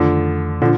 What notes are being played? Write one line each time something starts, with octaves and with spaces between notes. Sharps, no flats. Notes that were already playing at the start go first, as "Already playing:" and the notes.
Already playing: F2 D3 D#3 F3 A3
A#2 D3 F3